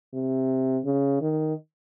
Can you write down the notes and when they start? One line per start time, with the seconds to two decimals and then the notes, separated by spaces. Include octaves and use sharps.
0.14 C3
0.85 C#3
1.21 D#3